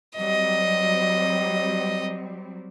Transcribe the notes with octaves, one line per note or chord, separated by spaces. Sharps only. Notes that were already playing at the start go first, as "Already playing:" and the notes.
F#3 G3 C4 D#5